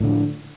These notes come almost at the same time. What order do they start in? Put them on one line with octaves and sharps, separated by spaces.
A2 D3 F3